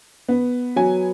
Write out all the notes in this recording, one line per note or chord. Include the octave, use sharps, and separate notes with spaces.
B3
F#3 G#5